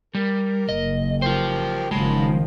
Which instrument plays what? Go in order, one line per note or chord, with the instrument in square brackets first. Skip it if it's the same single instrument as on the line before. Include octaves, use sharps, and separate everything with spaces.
[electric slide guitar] G3 [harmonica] A#4
[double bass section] F#1 [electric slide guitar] D#5
[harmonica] G3 A#4 G5 [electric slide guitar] F4 C5
[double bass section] F#1 D#3 F3 [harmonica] F#3 A5 B5 [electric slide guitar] G#3